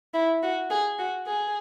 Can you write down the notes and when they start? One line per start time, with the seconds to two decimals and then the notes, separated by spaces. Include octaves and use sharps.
0.14 E4
0.43 F#4
0.70 G#4
0.99 F#4
1.27 G#4